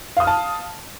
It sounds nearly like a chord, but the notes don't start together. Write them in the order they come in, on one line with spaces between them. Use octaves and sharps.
F5 D#6 F6 A5